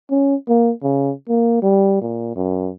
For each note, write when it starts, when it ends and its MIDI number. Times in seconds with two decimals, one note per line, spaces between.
0.10 0.35 61
0.48 0.72 58
0.83 1.12 49
1.29 1.59 58
1.62 2.00 55
2.01 2.31 46
2.36 2.71 42